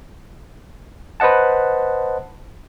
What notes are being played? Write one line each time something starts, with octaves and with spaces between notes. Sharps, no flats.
B4 C5 D#5 F#5 A5